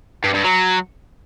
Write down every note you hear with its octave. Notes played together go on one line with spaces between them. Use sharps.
G2
G2
F#3